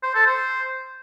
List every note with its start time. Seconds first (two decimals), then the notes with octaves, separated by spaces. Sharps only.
0.03 C5
0.15 A4
0.26 C5